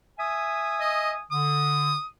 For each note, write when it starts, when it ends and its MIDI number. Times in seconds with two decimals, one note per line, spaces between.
0.19 1.22 76
0.19 1.22 80
0.19 1.22 87
0.80 1.12 75
1.31 1.92 50
1.31 2.06 87